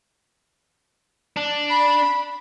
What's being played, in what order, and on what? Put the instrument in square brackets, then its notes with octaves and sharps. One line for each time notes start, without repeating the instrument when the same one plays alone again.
[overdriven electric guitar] D4
[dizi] B5